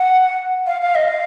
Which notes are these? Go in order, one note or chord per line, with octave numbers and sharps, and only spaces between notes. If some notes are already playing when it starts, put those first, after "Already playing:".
Already playing: F#5
F5
F5
D#5
F5